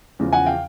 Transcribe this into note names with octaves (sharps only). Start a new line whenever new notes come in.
E2 C#3 F3
F#5 G#5
F5 G5